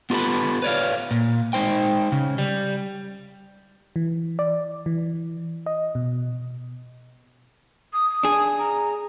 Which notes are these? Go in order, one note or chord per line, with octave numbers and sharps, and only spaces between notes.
B3 F4 G4 A4 B4 B5
B4 C#5 D5 F5
A#2
G#3 D#4 C5 G5
C#3
G3
E3
D5
E3
D#5
B2
D#6
D4 G#4
A#5